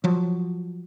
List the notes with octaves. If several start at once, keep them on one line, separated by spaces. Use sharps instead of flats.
F3 F#3